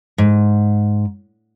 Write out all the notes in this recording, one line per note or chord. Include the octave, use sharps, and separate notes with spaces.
G#2